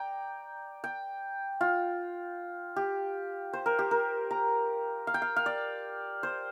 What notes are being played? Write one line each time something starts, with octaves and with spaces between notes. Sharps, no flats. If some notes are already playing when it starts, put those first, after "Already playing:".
Already playing: D5 G5 A#5
G5
F4
G4
C5
A#4
G4
A#4
A#5
F5
G5
F5
F5
D5
C5